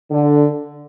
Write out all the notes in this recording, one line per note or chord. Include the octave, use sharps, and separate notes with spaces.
D3